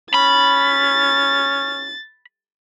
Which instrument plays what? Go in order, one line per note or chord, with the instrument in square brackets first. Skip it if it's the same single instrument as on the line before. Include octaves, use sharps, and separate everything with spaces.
[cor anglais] C#4 [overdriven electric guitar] B5 [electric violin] A6